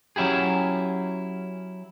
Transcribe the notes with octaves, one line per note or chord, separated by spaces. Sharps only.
F#3 C#4 E4 G4 G#4